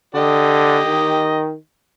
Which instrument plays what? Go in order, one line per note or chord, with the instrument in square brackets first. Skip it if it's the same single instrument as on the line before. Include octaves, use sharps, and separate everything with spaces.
[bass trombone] D3 [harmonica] G4 D#5
[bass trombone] D#3